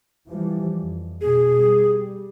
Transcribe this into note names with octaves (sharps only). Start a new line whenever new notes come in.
E3 F3 G3
F2
B2 G#4
G3